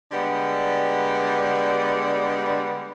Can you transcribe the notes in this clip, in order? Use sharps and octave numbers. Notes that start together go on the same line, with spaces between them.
D3 G3 G#3 B3